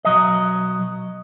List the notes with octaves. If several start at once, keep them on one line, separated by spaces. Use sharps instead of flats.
B1 F#3 D#5